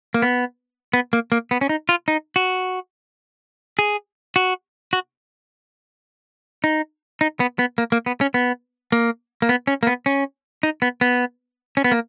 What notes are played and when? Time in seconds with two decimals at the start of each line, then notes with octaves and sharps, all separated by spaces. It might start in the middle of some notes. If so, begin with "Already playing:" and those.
0.14 A#3
0.22 B3
0.93 B3
1.13 A#3
1.32 A#3
1.51 B3
1.61 C#4
1.69 D#4
1.89 F4
2.08 D#4
2.36 F#4
3.79 G#4
4.36 F#4
4.93 F#4
6.64 D#4
7.21 D#4
7.40 B3
7.59 B3
7.78 A#3
7.92 A#3
8.06 B3
8.21 C#4
8.34 B3
8.92 A#3
9.42 A#3
9.49 B3
9.67 C#4
9.83 A#3
9.87 B3
10.06 C#4
10.63 D#4
10.82 B3
11.01 B3
11.77 C#4
11.84 B3
11.92 A#3